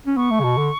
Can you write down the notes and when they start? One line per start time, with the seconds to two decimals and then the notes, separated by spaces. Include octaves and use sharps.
0.06 C#4
0.17 B3 C#6
0.30 A3
0.40 C#3
0.44 B2
0.58 D3